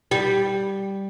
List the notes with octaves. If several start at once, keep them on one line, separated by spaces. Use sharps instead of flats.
G3